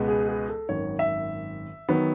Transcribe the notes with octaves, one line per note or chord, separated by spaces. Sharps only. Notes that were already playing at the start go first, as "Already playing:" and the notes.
Already playing: C#2 B2 G#3 B3
G#4
G#4
A4
G#1 F#2 D#3 C#5
E5
D#3 F#3 B3